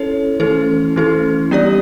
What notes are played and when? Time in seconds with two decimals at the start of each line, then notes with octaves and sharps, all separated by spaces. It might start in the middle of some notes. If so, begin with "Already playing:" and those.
Already playing: C#4 E4 A4 C#5
0.40 E3 A3 C#4 E4 A4
0.96 E3 A3 C#4 E4 A4
1.51 G3 B3 D4 G4 D5